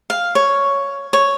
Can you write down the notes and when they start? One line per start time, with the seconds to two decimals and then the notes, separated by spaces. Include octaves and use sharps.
0.10 F5
0.35 C#5
1.13 C#5